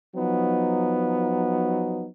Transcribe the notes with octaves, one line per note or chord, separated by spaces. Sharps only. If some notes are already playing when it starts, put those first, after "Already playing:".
F3 F#3 B3 D#4